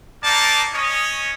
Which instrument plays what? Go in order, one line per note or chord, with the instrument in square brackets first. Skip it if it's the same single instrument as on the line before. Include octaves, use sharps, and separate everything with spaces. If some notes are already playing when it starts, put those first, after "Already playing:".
[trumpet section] A#3 D#4 D5 A5
C#4 C#5 D#5